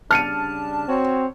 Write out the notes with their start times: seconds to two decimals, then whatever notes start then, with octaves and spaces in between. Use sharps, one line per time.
0.11 C#3 G3 D4 A5 F6 C#7 D#7
0.89 C4 F#4 C#5